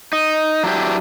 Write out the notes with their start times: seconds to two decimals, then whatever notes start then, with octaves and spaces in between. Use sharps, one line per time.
0.13 D#4
0.63 F#3 D4 E4 F4 G4